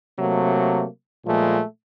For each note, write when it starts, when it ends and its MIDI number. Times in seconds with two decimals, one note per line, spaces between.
0.19 0.86 48
0.19 0.86 54
0.19 0.86 57
0.19 0.86 58
1.26 1.62 46
1.26 1.62 53
1.26 1.62 56
1.26 1.62 57